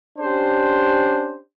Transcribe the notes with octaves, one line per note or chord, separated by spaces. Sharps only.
C#4 D4 G4 C5